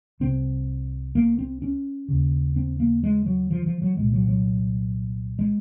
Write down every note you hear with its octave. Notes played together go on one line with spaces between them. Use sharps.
C2 C3 C4
A#3
C4
C#4
D#2 C#3
C4
A#3
G#3
F#3
F3
F3
F#3
C2 A#2 G#3
F#3
F#3
G#3